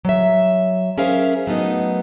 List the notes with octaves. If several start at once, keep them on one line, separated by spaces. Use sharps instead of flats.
F#3 E5
C#4 G#4 A#4 C5 E5 F5
F#3 A3 B3 D#4